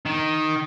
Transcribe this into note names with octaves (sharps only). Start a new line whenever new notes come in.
D#3